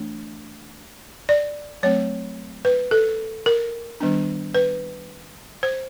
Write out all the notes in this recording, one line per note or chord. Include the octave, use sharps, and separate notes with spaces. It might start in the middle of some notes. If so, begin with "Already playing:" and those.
Already playing: E3 A3 D4
D5
F#3 A3 C4 C#5
B4
A4
A#4
D#3 G3 B3 D4
B4
C5